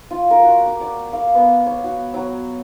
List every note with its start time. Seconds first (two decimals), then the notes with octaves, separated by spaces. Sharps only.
0.11 F4
0.31 A#4
0.43 F#4
0.66 D6
0.81 D5
1.13 F5
1.34 B3
1.66 C#5
1.84 F#4
2.14 F#3